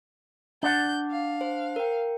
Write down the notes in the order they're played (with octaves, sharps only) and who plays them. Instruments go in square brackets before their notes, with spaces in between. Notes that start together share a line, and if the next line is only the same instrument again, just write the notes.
[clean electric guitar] D4 D5 F#5 [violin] G6
[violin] F5
[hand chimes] C5
A#4 G5